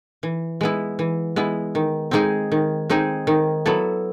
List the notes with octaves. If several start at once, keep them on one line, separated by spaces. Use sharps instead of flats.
E3
G#3 B3 E4
E3
G#3 B3 E4
D#3
G#3 C4 D#4 G#4
D#3
G#3 C4 D#4 G#4
D#3
F#3 B3 E4 A4